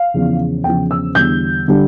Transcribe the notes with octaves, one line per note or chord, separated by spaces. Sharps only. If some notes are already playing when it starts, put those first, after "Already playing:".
Already playing: F5
E2 C#3 F3
E2 C#3 F3 G5
E6
E2 D3 G3 G6
D3 G3